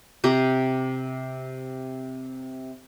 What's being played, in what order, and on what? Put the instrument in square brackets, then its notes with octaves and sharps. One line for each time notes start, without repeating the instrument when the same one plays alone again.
[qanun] C3 G4 A#5